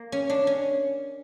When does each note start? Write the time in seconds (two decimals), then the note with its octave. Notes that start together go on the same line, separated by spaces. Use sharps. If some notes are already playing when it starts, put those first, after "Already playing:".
Already playing: A#3
0.12 C#4
0.30 D4
0.47 C#4